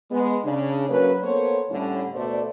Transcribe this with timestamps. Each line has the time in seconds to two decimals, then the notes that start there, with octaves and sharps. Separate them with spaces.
0.11 G#3 B3
0.44 C#3 D4
0.90 F#3 A#3 C#4 B4
1.23 A#3 B3 A4 C5 C#5
1.71 A2 D3 G3 C#4 D4 E4
2.14 D2 B2 A3 C5 D5